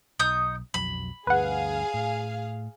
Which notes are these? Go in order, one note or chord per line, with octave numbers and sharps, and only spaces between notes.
B1 D#4 D#6 G6
B1 F2 F#3 B5
D2 G2 G#4 B4 F5 F#5
A2